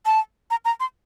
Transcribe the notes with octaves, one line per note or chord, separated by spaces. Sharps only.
A5
A#5
A#5
C6